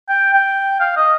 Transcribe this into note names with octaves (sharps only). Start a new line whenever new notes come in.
G5
G5
F5
D#5